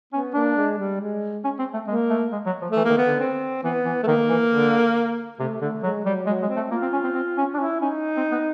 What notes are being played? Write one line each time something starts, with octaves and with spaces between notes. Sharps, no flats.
B3 C#4
A#3 D4
G#3
G3
G#3
C#4
C4
A3
G#3 A#3
A3
G#3
F#3
F3
A3
E3
A#3
D#3
B3
D3
C4
E3 B3
E3
A3
D#3 A#3
E3
D3
C3 A3
D3 A3
F#3 G#3
F#3 G3
F#3 G#3
G#3
C4
A3
A#3 F4
C4
C#4
C4
C4
C#4
D4
C#4 E4
C#4 D#4
C4
B3